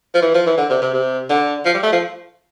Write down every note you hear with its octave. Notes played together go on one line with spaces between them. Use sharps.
F3
E3
F3
E3
D3
C3
C3
C3
D3
F3
G3
A3
F3